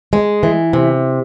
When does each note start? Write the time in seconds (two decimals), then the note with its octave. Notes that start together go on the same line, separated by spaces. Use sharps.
0.13 G#3
0.43 E3
0.73 C3